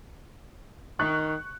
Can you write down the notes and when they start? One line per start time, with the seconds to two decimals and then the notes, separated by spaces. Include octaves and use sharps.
0.99 D#3 C#6 F#6